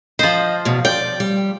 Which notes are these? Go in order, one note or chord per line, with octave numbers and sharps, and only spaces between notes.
F3 C5 D#5
E2 B2
D5 G5
G3